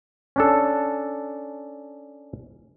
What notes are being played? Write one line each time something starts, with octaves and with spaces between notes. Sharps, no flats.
C#4 D4 A4